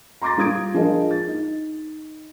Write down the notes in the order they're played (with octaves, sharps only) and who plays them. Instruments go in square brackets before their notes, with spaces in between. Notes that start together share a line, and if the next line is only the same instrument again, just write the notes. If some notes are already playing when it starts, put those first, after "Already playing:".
[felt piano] A#5 C6 D6 A6 A#6
G3 F4 D#6 G#6 D7
F3 D4 G#4 A#4 D#5
A6
D#4